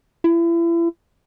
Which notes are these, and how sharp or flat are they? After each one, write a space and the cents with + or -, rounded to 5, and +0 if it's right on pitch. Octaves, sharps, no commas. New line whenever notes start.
E4 +35